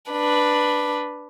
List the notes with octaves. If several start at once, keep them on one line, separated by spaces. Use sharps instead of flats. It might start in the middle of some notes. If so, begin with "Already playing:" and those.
D4 B4